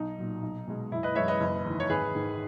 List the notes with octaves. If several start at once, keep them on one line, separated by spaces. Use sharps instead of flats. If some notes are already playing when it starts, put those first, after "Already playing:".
Already playing: B1 D#4
A#2 F#3
B1
B2 G#3
F#1 E4
B4 D#5
F#2 E3 G#3 C#5 E5
B4 D#5
F#1
E2 D#3
C#5
G#1 G#4 B4
G#2 D#3 G#3